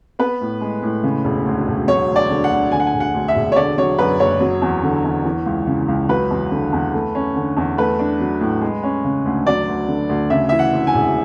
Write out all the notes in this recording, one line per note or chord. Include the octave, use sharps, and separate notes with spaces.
B3 B4
A2
G#3
A2
C#3
E1
D2
E1
F#3 C#5
D2
D5
D3
F#5
D2
D3 G#5
F#5
G#5
E1
F#5
D2
E5
E1
C#5
D3 D5
F#3 C#5
F#2 B4
F#1 C#5
F#3
E2
D3
E2
E3
C#2
C#3
C#2
F#3 B4
E2
D3
E2
A3
C#4
D3
E2
A3 B4
D4
F#3
A2
G#3
C#4
C#3
D2
F#3 D5
D2
D3
D2
C#3 E5
E3 E5
F#5
D2
G#5
E1